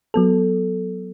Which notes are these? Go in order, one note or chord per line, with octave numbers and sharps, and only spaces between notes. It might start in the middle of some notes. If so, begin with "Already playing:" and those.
F#3 B3 A4